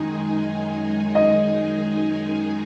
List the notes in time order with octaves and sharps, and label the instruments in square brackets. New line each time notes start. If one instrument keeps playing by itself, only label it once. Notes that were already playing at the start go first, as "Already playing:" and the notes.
Already playing: [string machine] F#2 D#3 G#3 D#4 G#4
[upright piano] D#5